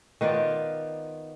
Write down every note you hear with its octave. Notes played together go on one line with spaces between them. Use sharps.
D#3 B3 F4 D5